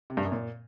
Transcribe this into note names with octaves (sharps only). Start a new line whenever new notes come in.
C3
G2
F#2
A#2